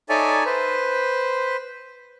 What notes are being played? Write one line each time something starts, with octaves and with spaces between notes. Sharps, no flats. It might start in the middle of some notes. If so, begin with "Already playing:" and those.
D#4 A4 C#5 D5 E5 G#5
B4 C5